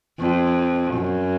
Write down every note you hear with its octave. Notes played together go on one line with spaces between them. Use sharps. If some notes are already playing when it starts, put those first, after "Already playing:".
F2
F#2